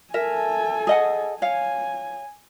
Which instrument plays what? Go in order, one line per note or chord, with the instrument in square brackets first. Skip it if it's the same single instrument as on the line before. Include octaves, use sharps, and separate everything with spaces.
[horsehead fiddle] A4 G#5 [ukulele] A#4 E5
[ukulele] G#4 D#5 F#5
[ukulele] C#5 F5 [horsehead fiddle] G#5